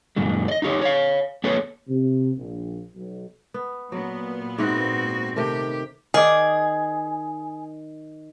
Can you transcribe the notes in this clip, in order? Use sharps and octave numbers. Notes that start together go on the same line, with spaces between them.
F#2 A#2 D#3 G#3
D5 D#5
D#4 F4 G4 C#5
C#5 F5
A#3 G#4 A4 B4 C#5
C3
A#1
B1
B3
A#2 F#3 B3
G#2 C4 E4 F#4 F#5
C3 D#3 A3 G4
D#3 G#4 D5